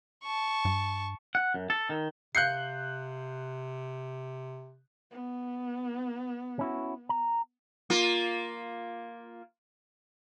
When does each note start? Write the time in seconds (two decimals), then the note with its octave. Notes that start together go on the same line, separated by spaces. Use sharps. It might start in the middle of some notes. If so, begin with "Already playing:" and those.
0.23 A5 C#6
0.65 G2
1.35 F#5
1.54 F#2
1.70 A4
1.89 D#3
2.35 C3 F5 F#6 G6 C7 C#7
5.11 B3
6.59 C#4 E4 F#4
7.09 A#5
7.90 A#3 F4